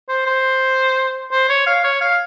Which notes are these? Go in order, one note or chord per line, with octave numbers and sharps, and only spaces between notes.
C5
C5
C5
C#5
F5
C#5
F5